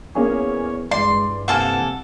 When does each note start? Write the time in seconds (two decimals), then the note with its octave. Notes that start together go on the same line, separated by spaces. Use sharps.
0.15 E2 A#3 C#4 G#4 C#5
0.91 G2 E3 G#3 D5 C6
1.48 C3 A#3 A4 F#5 G#5 E6